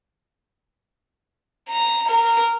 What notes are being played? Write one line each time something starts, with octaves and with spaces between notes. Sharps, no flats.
A#5
A#4